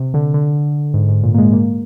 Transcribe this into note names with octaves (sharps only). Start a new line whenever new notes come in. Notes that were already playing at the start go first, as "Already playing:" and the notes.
Already playing: C3
D3
D3
G#2
G#2
A#2
A#3
G#3
A#3